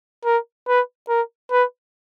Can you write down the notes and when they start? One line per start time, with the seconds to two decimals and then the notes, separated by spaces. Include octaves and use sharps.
0.25 A#4
0.68 B4
1.09 A#4
1.51 B4